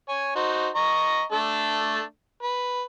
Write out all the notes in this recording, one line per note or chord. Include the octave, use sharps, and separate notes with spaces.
C#5 G#5
D#4 F#4 C5
D#5 A#5 C#6
A3 D4 A4
B4